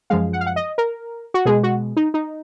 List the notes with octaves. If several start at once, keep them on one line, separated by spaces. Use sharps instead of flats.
F#2 F3 G#3 F5
F#5
F5
F#5
D#5
A#4
F#4
B2 G#3 G#4
F#4
D#4
D#4